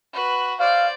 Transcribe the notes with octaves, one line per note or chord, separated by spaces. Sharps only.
F#4 B4
C5 D5 F5